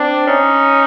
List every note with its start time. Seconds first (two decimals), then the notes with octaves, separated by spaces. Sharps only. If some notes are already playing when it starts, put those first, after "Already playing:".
Already playing: C4 D4
0.28 C#4 D#4